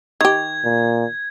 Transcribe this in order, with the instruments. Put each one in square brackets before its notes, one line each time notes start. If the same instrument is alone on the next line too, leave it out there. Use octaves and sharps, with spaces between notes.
[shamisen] D#3 G4 [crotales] G#6
[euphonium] A#2